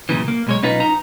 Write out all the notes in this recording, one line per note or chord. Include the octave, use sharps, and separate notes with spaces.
F#2 A#2 C#3 E3
A#3
B1 G#3 C#5
B1 C#4 D#4 F4 B4
D#4 A#5